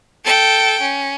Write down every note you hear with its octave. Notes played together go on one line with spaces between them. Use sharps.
A4 G5
C#4